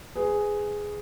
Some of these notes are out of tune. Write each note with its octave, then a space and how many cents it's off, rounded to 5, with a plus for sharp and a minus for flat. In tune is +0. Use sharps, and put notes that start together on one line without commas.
G#4 +0 B4 +30